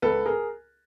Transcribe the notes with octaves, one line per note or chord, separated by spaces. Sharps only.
C#2 A4 B4
G#4 A#4